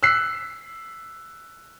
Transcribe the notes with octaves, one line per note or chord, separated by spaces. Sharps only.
E6 F#6 B6 C7